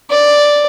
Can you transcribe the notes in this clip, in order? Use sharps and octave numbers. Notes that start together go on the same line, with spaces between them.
D5